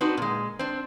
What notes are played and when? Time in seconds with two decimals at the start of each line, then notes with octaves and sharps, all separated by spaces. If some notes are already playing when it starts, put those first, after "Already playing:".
0.01 C4 D4 D#4 F#4 B4
0.17 A#2 G#3
0.59 C4 D4